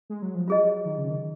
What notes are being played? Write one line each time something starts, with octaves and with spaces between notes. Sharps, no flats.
G#3
F#3
F3
F#3 F4 G#4 D#5
D#3
C#3
D#3